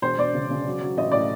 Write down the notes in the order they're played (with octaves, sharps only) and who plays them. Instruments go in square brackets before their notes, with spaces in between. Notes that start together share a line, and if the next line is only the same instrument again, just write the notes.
[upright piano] E1 C5
E1 D5
C#3
C#3
F#3
F#3
A1 D#5
A2 D5